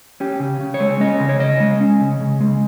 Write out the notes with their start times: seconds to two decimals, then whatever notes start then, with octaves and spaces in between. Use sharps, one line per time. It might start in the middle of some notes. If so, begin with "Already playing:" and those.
0.20 C#4 G4
0.40 C#3
0.61 C#3
0.74 C#5
0.80 G#3
1.00 C#4 D#5
1.20 C#3
1.29 C#5
1.40 C#3 D#5
1.60 G#3
1.80 C#4
2.01 C#3
2.21 C#3
2.41 G#3